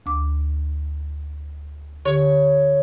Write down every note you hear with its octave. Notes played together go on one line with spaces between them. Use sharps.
D2 D6
D3 G4 C#5